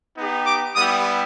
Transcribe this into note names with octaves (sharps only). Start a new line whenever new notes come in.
B3 D#4 G4
D6
G3 B3 E4 G4 D#6